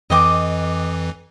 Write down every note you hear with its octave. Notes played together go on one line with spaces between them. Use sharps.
F2 E3 D#5 G5 D6